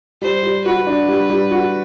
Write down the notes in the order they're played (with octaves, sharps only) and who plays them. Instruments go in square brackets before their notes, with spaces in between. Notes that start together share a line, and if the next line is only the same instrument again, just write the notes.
[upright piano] G3 [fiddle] C5
[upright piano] G3
[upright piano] F#4 [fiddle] B4
[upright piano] D4
G3
G3
F#4